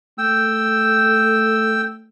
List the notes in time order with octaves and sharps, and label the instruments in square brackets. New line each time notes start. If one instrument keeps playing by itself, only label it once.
[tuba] A3 [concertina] G5 E6